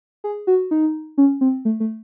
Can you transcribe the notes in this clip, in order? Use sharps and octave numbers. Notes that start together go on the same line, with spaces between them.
G#4
F#4
D#4
C#4
C4
A3
A3